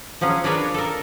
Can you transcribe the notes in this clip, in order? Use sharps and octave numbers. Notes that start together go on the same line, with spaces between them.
F3 F#3 C#4 G#4
D4 G#4 A#4 B4 C#5 D5
A4 A#4